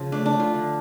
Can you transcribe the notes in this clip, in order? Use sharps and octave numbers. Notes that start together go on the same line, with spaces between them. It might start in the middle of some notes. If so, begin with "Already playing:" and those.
Already playing: C#3 F3
A3 D4
D4
A3
F4
D3